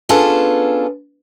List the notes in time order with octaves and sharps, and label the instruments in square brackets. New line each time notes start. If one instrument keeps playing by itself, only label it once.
[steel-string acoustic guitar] B3 C#4 D4 F4 G#4 A4